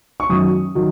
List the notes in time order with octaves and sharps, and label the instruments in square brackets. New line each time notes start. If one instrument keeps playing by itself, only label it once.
[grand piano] C#6
F#2 D#3 F#3 D#6
D#3 F#3